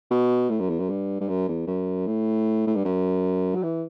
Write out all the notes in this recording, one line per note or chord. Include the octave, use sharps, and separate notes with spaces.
B2
A2
F#2
E2
F#2
G2
G2
F#2
E2
F#2
A2
A2
G2
F#2
F#3
E3